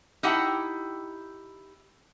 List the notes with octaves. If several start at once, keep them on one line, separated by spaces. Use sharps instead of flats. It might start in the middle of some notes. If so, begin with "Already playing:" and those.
D#4 E4 G4 F#5 G5 A5